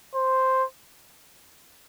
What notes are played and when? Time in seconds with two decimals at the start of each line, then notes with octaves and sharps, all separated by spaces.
0.15 C5